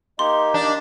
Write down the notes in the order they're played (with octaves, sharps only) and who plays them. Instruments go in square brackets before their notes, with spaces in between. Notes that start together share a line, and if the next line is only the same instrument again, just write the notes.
[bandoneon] A#3 D#4 G4 [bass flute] D#5 [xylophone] C6
[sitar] D4